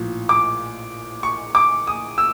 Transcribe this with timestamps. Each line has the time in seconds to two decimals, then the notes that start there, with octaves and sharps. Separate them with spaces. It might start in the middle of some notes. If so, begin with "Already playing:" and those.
Already playing: A#1 A2 F3
0.29 D6
1.23 C#6
1.55 D6
1.87 D#6
2.18 E6